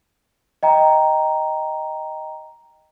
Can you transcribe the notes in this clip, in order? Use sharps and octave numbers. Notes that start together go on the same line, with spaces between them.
D#5 G5 A#5